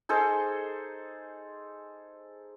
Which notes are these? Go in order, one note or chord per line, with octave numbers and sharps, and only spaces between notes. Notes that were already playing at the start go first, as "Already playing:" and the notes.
D#4 G#4 A4 C5